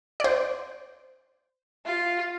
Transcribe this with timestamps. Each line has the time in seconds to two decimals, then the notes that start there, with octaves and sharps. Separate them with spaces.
0.20 C5 D5
1.85 F4